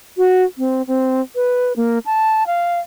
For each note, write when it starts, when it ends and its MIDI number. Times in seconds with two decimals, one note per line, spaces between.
0.18 0.43 66
0.58 0.82 60
0.87 1.21 60
1.36 1.73 71
1.76 1.99 58
2.06 2.46 81
2.47 2.80 77